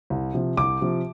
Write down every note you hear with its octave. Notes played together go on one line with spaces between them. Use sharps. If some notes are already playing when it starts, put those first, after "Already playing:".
C2
C3 F3
C2 D6
C3 F3